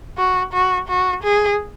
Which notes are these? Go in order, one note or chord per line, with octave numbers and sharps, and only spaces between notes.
F#4
F#4
F#4
G#4